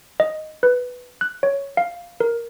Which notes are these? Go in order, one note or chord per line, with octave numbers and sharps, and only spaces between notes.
D#5
B4
F#6
C#5
F5
A#4